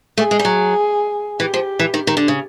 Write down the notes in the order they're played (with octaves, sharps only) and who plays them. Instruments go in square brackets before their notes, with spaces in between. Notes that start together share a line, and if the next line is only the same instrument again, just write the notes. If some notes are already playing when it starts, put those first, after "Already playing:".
[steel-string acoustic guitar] A3 [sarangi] G#4
[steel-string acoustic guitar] G#3
G3
F#3
[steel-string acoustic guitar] E3 [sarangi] G4
[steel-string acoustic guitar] F3
E3
D#3
D#3
D3
C#3